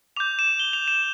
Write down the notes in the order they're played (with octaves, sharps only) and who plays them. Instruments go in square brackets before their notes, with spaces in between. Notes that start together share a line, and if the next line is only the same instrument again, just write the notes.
[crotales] D6 G6 F7
E7
G7
F7
E7